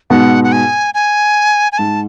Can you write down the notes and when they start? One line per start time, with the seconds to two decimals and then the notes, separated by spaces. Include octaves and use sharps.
0.10 G#2 B2 F#5
0.44 F#5
0.52 G#5
0.94 G#5
1.72 G#5
1.78 G#2 A5